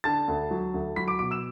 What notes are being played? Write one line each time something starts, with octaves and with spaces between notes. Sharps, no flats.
D3 A5 A6
D2
F#3
D2
F#3 B5 B6
D6 D7
B2 D6 D7
E6 E7